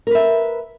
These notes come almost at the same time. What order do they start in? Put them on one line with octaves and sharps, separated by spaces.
A#4 B4 E5